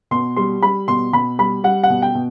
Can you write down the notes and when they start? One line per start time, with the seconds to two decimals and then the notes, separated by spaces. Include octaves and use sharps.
0.11 B2 C6
0.36 G3 C6
0.62 G3 B5
0.88 B2 C6
1.13 B2 B5
1.39 G3 B5
1.64 G3 F#5
1.83 F#5
1.90 B2
2.02 G5
2.15 B2